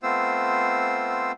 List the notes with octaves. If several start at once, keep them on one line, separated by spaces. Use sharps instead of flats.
A3 B3 C4 F4 C5 E6